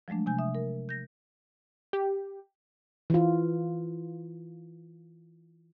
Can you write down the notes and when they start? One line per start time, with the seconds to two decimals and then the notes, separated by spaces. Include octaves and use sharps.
0.08 F3 F#3 G#3 A3 D4
0.26 C3 G#5 G6
0.39 E5 D#6
0.55 A#4
0.89 G6 A#6
1.93 G4
3.10 E3 F4